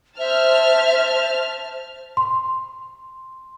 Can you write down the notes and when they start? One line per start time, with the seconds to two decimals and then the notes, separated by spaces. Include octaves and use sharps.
0.18 C5 E5 A5 F6
2.17 C6